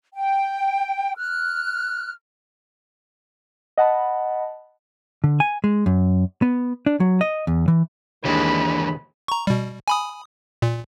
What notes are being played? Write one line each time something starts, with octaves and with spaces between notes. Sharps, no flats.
G5
F6 F#6
D#5 F#5 A5 B5
D3
G#5
G#3
F#2
B3
D4
F#3
D#5
E2
E3
D#2 E3 G#3 A#3 D4 B5
A#5 C#6
B2 G3
G#5 B5 D#6
A#2